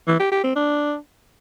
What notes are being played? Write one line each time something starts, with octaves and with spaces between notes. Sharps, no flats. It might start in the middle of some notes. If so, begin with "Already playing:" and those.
E3
G4
G4
C4
D4